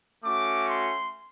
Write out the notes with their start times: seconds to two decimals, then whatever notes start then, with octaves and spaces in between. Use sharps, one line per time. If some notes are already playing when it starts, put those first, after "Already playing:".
0.24 A3 C#4 F#4 D6
0.69 C6